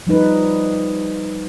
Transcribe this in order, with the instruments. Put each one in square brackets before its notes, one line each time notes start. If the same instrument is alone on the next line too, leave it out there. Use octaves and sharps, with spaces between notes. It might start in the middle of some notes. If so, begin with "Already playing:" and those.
[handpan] F3 G3 D#4 B4